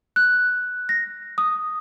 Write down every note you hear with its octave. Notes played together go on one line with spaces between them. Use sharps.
F#6
A#6
D#6